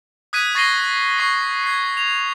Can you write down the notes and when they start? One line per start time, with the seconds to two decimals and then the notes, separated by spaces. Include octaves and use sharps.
0.33 D#6 F#6 G#6 B6 D#7
0.55 C#6 A6 A#6 C7 D#7 G7
1.18 C#6 C7
1.64 G#6 C7
1.97 F7